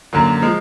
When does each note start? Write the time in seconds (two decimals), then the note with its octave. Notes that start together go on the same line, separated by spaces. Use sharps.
0.13 F#2 D3 F#3 A#3
0.42 F3 G#3